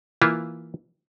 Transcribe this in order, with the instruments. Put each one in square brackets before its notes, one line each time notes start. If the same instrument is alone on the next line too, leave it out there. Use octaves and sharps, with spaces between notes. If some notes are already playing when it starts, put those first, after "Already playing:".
[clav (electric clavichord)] E3 A#3 E4 F4